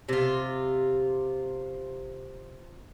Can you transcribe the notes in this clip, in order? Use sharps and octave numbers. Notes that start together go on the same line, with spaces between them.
C3 F4